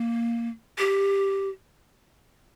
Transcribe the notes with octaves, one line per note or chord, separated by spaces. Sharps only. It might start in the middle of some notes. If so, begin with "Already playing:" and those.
Already playing: A#3
G4